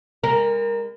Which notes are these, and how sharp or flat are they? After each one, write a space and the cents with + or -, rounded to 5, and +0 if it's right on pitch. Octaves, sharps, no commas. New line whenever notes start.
G#3 -45 A#4 +0